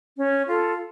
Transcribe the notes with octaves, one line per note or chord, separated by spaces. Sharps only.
C#4
F4 A4